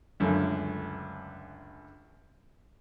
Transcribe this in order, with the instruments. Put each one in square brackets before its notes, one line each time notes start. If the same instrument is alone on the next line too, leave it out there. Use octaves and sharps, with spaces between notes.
[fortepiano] C#2 F#2 D3 A3